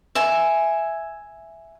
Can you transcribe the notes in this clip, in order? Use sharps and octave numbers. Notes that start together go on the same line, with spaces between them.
E5 G#5